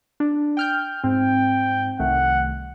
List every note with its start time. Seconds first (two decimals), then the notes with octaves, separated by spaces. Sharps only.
0.20 D4
0.57 G5 F6 G6
1.04 G#2 C4 G5
2.00 C2 D#3 A3 F#5